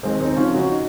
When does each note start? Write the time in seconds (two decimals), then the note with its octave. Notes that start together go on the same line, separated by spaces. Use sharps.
0.03 D#2 G#3 C4
0.20 C4 D#4
0.36 C#3 F3 C#4 F4
0.53 D#4 F#4